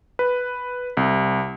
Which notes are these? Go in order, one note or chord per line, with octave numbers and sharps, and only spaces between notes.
B4
C2